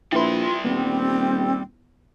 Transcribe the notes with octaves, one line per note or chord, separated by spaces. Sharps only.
A#1 G3 E4 F4 A4 B4 C6
D#1 B3 C4